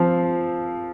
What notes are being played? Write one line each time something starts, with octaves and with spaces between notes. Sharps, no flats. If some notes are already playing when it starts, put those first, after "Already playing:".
Already playing: F3 C4 F5